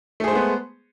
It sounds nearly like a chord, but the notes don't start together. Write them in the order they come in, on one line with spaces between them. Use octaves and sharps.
A3 G#4 C5 G#3 B3